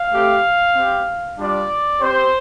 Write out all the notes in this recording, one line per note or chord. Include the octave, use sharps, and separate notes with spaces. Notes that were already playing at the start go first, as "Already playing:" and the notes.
Already playing: F5
A3 C4 G4
C4 G4
G3 D4 F4 D5
C4 G4 C5